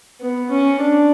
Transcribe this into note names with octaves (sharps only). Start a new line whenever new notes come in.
B3
C#4
D4